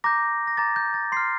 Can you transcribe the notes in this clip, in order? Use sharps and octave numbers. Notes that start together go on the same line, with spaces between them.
A#5 D6 G6 A#6
A#6
A#5 D6 G6 A6
G6
A6
C6 F6 C7